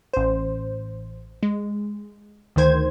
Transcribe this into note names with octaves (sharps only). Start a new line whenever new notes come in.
A1 C5
G#3
D2 D#3 C5 G#6